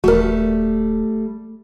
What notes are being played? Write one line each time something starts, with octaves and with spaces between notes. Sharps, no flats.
D#1 G3 A3 F#4 A#4